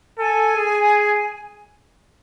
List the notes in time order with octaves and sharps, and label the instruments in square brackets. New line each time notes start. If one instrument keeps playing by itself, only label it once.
[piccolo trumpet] A4 [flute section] G#5
[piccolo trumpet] G#4